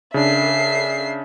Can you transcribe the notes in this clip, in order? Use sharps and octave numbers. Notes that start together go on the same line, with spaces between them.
C#3 D4 E5 C7